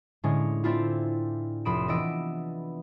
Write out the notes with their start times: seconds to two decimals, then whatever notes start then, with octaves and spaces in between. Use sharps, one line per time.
0.24 A2 D3 G#3 C#4 D4
0.64 C4 D4 E4 F4
1.65 F1 B5 C6 D#6 D7 E7
1.88 E3 B3 D4 D#5 E6 D7